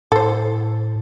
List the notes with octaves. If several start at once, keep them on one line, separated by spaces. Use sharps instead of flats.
A2 A4 C5